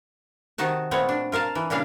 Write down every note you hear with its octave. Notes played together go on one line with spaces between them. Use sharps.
C3 D#3 D#4 F#4 A5
A#2 A3 B3 C4 C#5
D4
F4 A#4 F5 A5
E3
A#2 C#3 G3 D4 F5